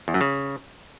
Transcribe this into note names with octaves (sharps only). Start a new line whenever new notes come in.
E2
F#2
C#3